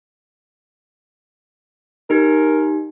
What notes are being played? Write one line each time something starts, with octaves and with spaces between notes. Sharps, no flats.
D#4 G4 A#4